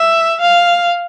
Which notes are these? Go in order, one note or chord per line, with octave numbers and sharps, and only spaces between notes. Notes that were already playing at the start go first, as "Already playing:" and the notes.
Already playing: E5
F5